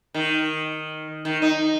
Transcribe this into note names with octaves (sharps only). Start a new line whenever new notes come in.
D#3
D#3
D#4